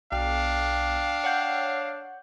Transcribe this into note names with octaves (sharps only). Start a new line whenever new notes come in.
B1 D4 F5 G5
C#5 F#5 G6